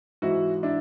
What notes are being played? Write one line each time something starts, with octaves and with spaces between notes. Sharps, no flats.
G#2 E3 E4 F#4
D4 E4